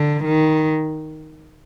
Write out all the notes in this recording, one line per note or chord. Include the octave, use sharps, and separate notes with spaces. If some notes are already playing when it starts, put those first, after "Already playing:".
Already playing: D3
D#3